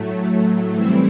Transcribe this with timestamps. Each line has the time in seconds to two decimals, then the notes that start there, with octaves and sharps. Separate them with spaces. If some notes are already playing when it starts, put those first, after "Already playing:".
Already playing: A2 F#3 A3
0.73 E3 G3 C4 E4